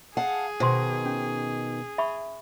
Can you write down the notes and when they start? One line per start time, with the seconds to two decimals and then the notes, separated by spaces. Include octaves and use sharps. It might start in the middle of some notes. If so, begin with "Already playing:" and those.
0.17 G#4 F5 F#5 A5
0.60 B2 D#3 C5 C6
1.06 C#4
1.98 E5 B5 C#6